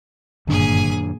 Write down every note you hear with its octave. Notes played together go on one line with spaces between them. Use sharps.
G1 F#2 A#2 D#3 D4 G#4 G#5